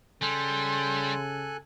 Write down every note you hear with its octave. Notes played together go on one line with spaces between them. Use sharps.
C#3 G3 A4 G#5 C6 F#6